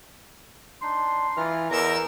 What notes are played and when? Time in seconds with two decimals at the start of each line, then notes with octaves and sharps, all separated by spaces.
0.82 D4 D#4 C6
1.37 E3 F4 A#5 F6
1.71 E2 A#4 D#5 A#5 E6